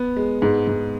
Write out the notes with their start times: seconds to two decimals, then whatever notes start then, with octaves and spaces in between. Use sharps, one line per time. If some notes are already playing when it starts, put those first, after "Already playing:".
Already playing: B3
0.17 G#3
0.42 G#2
0.67 G#2